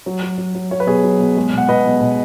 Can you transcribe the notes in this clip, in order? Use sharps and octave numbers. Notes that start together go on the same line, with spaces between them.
F#3
F#3
F#3
F#3
F#3 C#5
B4
B2 G#4 C#5
F#3
B2
G#3
B2 F#5
B2 B4 D#5
B2
B2